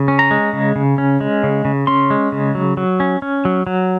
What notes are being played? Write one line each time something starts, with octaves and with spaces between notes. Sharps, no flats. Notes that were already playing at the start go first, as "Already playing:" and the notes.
Already playing: C#3
C#4
A#5
G#3
C#3
C#3
C#4
G#3
C#3
C#3
C#4 C6
G#3
C#3
F#3
F#3
C#4
C#4
F#3
F#3